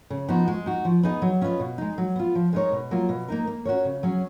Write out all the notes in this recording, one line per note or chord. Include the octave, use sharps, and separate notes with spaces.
C#3
F3 B3 D#4 F#4
G#3
D#4 F#4
F3
B3 D#4 G#4 D#5
F#3
C#4 F4 B4 D#5
B2
G#3 D#4
F#3
B3 F4
F3
G#3 D#4 A#4 C#5
B2
F#3 A#3 F4
B2
A#3 D#4 A#4
A#3
C#4 F#4 A#4 C#5
C#3
F#3 C#4 G#4